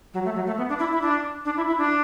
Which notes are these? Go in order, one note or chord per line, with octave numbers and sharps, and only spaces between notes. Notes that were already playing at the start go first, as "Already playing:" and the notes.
F#3
A3
F#3
A3
B3
D4
E4
E4
D4
D4
E4
E4
D4